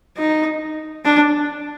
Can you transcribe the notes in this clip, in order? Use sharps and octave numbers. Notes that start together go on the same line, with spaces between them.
D#4
D4